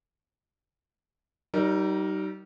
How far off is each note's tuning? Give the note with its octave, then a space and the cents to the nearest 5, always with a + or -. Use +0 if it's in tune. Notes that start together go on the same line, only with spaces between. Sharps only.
G3 -40 D#4 +0 A#4 +0